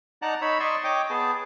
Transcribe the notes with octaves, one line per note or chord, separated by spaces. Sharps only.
D#4 D5 F#5 A5 A#5 F#6
D#4 C#5 B5 E6
D5 D#5 C6 C#6 E6
C#5 D#5 G5 D6
B3 G#4 A5